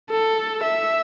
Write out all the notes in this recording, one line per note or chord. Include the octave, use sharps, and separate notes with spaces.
A4
E5